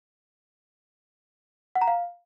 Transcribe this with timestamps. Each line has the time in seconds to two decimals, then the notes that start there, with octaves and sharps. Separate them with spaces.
1.75 F#5
1.81 A#5
1.87 F5